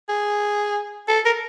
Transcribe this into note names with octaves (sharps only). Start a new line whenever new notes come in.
G#4
A4
A#4